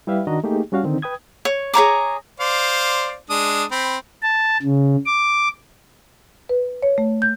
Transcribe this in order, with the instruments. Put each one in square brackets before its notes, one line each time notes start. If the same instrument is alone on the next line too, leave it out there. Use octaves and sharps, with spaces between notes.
[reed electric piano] G3 E4 G4 B4 E5 F5
D#3 D4 F#4 D#5 A#5
A3 A#3 D#4 G4 G#4
G3 C#4 F#4 F5
D3 D#3 C4 D#4
B4 G5 D#6 G#6
[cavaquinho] C#5
G#4 C#5 A#5 D6
[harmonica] C5 D5 F5
G#3 D4 D#6
C4 B5
[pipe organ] A5
C#3
D6
[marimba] B4
C#5
A3
G6